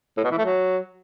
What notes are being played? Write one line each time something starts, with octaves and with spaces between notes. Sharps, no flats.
A2
B2
E3
A3
F#3